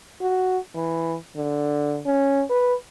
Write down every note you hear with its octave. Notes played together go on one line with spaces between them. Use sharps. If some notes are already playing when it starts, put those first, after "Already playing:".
F#4
E3
D3
C#4
B4